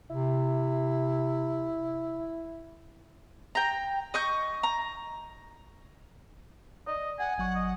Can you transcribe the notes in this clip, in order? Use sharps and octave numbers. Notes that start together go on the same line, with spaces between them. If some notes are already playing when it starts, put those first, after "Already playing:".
C3 E4
G5 A#5
D#5 C#6 G6
A#5
D5 D#5
F#5 G#5
G#1 F#3 F#5 C#6
D#5